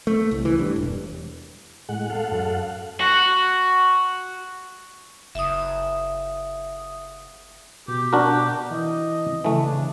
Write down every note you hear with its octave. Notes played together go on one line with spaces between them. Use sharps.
A3
C2
E3
G2
E1
A2 G#3 F#5
A4 F5 F#5
F#2
F#4
F#1 E5 D#6
B2 G4
D4 F#4 A#4
E3 D#5
C#3 E3 A3
D4